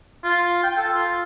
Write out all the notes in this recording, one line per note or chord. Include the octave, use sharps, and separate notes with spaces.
F4
G5
A4
F4